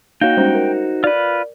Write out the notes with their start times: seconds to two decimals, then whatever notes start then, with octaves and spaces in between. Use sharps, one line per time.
0.21 A#3 D#4 F#4 C#5 F5 G5
0.37 G3 G#3 C#4 C5
0.55 A#4
1.04 F4 B4 D5